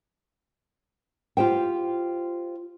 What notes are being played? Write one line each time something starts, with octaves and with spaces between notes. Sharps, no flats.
F4 G4 C5 G5